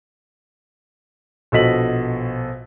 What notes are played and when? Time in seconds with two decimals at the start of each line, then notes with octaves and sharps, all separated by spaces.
1.52 A#1 B2 A4 D#5 B6 F#7